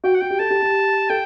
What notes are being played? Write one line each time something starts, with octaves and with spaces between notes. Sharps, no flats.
F#4 G5
F#5
F#4 G5
G4
A4 A5
G4
G4
A4 G5